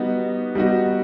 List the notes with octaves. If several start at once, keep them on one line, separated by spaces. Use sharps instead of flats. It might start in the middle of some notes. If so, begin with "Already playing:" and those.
Already playing: G3 B3 D#4 F#4
G3 B3 D#4 F#4